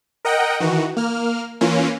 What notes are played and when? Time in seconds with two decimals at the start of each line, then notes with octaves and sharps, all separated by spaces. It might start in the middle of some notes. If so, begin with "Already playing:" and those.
0.25 A#4 D#5 F#5 G5
0.60 D#3 E3 F#4
0.97 A#3 F6
1.61 E3 A#3 C#4 F4